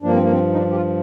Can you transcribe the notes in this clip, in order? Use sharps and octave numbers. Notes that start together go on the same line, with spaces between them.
G2 F3 A#3 D4
C4
A#3
C4
D#4
D4
G4
F4